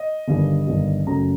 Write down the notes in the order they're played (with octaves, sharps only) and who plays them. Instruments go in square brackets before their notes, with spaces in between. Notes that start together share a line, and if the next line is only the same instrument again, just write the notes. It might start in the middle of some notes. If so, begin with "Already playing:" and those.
Already playing: [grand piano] D#5
G1 G2 D#3 G3
G1 G2 D#3 G3
F#1 F#2 F#3 A3 A#5